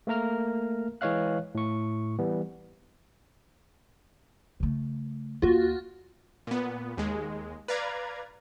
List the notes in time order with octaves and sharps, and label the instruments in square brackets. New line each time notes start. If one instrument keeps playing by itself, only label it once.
[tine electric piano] A3 A#3 A#4 A#5 F6
E3 G#3 C#5 D#5 F5 F#6
A2 C#6
E3 G3 B3
[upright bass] C#3 A3
[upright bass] D#2 A#3 [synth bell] F4 F#4
[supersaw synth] A#2 B3
D#2 G#3
B4 D5 F5 A#5 G#6